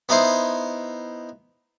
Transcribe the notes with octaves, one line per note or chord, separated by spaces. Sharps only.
B3 D#4 E4 C5